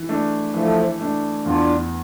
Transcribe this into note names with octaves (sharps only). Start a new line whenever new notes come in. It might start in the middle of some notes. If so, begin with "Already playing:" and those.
Already playing: E3
A3 D4
E3 F3 A3
A3 D4
E2 D4 F4